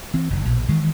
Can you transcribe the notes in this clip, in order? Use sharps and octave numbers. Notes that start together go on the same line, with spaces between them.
E3 C4
F1 D3
A#1 B2
D#3 E3 G#3